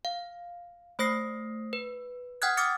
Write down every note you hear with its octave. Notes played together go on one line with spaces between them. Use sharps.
F5
A3 C5 D#6 A#6 C7
B4
F#5 G5 D#6 F6 F#6 G#6
D6 D#6 F6 A6 C#7